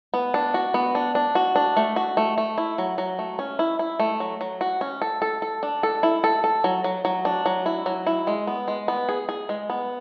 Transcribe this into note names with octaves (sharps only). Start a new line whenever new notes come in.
B3
D4
F#4
B3
D4
D4
F#4
D4
A3
F#4
A3
A3
E4
F#3
F#3
A3
C#4
E4
E4
A3
F#3
F#3
F#4
C#4
A4
A4
A4
D4
A4
E4
A4
A4
F#3
F#3
F#3
D4
F#3
E4
F#3
E4
G#3
B3
G#3
B3
G#4
G#4
G#3
B3